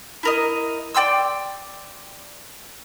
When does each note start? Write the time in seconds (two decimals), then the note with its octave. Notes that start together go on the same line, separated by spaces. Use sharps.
0.23 E4 A#4 D#5
0.95 D5 G5 C6 E6